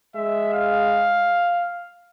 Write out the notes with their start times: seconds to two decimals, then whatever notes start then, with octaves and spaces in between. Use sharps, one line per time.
0.15 G#3 E5
0.53 F5